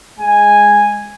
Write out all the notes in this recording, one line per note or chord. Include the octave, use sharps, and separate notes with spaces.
G#3 G#5